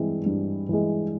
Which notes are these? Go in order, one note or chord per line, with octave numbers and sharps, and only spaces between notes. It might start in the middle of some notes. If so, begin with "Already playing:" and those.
Already playing: G2 E3 G#3 C4
G2
E3 G#3